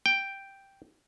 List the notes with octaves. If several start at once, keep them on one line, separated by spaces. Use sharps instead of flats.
G5